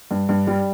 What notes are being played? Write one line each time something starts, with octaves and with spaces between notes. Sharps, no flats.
G2
G2
G3